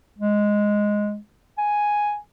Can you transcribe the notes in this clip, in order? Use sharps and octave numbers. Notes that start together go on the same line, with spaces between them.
G#3
G#5